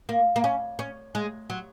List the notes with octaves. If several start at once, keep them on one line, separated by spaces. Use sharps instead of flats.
A#3
A#3
C#4
C#4
G#3
F#3